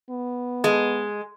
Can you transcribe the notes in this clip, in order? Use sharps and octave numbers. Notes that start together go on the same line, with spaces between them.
B3
G#3